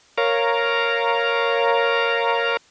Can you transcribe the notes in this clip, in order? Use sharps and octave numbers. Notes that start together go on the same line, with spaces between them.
A#4 C#5 F5 A#5